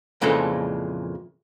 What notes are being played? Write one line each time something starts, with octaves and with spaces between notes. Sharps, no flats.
F2 A#2 C#3 E3 G#3 A4